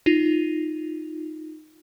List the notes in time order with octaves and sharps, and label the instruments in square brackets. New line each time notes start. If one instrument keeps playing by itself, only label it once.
[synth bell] D#4 F4